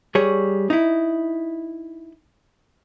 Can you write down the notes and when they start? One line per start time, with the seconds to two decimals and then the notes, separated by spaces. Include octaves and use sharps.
0.15 G3 G#4 C#5
0.70 D#4 E4